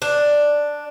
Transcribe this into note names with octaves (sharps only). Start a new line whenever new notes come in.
D4